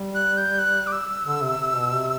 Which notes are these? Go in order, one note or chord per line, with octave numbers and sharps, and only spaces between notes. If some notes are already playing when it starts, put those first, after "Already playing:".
Already playing: G3
F#6
G6
F#6
D6
E6
D3
C3
C3
B2
C3